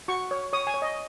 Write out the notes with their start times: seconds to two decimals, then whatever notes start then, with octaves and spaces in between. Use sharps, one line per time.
0.08 F#4 C#6
0.31 C#5
0.53 C#5 D#6
0.67 G#5
0.74 C#5
0.82 D#5